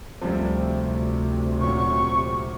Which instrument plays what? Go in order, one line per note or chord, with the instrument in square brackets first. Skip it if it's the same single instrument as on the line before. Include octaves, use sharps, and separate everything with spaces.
[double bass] D2 [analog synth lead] C3 [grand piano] F3 G3
[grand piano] A#2 F#3 [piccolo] C#6